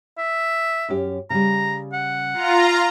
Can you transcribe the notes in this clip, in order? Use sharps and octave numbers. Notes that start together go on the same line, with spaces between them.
E5
F#2 C#4 G4
C#3 G3 A#5
F#5
F4 A#5